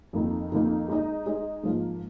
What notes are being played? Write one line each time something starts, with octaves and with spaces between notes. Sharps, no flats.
F2 D#3 A#3 D#4
F2 D#3 A#3 D#4
G#3 D#4 G#4 D#5
G#3 D#4 G#4 D#5
G#2 F3 A#3